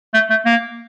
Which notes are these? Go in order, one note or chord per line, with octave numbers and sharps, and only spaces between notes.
A3
A3
A#3